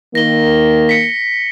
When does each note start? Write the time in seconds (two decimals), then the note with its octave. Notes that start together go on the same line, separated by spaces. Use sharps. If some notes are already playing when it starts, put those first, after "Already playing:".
0.15 D#3 A#3 A#6 G7
0.89 B6 C#7